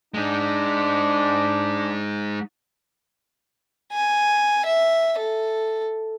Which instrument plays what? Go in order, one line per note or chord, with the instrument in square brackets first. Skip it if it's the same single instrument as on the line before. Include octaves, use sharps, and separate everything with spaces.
[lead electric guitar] G#3 D#4 [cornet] D4
[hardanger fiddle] G#5
E5
A4